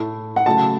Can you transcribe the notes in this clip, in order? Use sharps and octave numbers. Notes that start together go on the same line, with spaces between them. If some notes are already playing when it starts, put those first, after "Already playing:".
Already playing: A2 A3 E4
F#5
C#3 F#3 A3 E4 A5